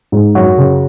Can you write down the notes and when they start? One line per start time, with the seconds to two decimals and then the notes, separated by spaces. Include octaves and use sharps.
0.12 G#2
0.35 F#2 F#4
0.58 C#3